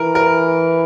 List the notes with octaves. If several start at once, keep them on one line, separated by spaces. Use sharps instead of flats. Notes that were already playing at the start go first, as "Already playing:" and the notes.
Already playing: E3 A#4
A#4